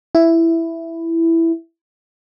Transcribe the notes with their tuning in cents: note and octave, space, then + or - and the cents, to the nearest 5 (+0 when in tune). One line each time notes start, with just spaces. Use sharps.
E4 +5